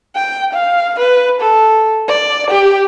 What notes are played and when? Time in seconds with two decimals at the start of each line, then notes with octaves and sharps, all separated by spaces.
0.16 G5
0.53 F5
1.00 B4
1.41 A4
2.08 D5
2.51 G4